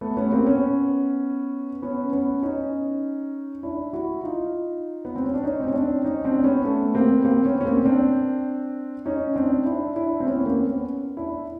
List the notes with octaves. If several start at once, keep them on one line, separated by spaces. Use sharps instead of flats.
A3 B3
B3 C#4
A#3 C4
B3 C#4
B3 C#4
B3 C#4
C#4 D#4
D4 E4
E4 F#4
D#4 F4
B3
C4
C#4
D4
C#4 D#4
C4
C#4
C4 D4
C#4 D#4
C4 D4
B3 C#4
A3 B3
A#3 C4
B3
A#3 C4
B3 C#4
C#4
A#3 C4
C4 D4
C#4 D#4
C4 D4
D4 E4
D4 E4
C4
B3 C#4
A#3 C4
B3 C#4
D4 E4